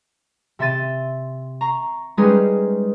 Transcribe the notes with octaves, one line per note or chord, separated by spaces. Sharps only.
C3 E5 C6 A6 D#7
A#5 C#6 C7
G3 G#3 C#4 D#4 G#4 B4